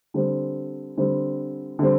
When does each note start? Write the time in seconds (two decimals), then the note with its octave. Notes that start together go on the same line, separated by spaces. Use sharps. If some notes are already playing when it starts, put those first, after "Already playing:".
0.14 D3 G3 C4
0.97 D3 G3 C4
1.79 D3 G3 C4